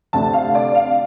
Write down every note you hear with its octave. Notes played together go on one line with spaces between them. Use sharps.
D2 C3 A3 D4 A5
F5
D5
F5